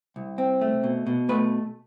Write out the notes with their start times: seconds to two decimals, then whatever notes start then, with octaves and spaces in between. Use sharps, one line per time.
0.16 C2
0.38 C4
0.61 A3
0.84 B2
1.07 B2
1.29 A3 B4